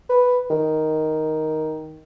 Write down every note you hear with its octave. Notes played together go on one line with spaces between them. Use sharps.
B4
D#3